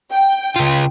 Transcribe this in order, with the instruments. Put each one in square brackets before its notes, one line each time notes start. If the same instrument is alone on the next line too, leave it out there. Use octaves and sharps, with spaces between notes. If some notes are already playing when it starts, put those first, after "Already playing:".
[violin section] G5
[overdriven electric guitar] C#3 F4